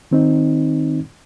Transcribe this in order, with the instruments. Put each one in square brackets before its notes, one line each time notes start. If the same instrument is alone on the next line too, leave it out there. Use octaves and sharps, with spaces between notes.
[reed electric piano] D#3 C4 D#4